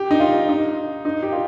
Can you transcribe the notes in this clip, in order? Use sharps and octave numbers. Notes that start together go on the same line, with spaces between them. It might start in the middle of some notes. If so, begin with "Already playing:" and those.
Already playing: G4
D#4
F4
D#4
D#4
G4
F4